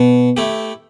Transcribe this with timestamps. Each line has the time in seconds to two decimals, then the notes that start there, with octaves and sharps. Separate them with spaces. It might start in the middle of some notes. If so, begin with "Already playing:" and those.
Already playing: B2
0.37 A3 E4 G4